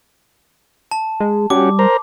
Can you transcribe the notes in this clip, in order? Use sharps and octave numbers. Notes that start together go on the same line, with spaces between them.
A5
G#3
G3 C#4 F#4 G4 D6
A#4 C5 A#5